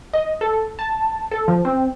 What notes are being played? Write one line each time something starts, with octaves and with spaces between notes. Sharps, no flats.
D#5
A4
A5
A4
F3
C4